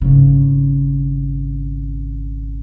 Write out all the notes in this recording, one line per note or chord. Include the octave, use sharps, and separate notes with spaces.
G#1 C#3